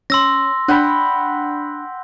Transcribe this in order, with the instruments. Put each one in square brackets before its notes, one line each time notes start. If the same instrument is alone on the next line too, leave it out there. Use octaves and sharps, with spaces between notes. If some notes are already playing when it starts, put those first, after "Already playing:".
[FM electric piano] C#4 [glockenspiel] C6 E6 A#6
[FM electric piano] D4 [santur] F#5 G5 B5